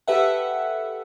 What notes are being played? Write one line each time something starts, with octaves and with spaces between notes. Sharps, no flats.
G4 A4 B4 E5 F#5